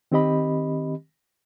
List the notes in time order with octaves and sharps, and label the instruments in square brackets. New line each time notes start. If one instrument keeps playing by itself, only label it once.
[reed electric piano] D#3 C4 G4 D#5 B5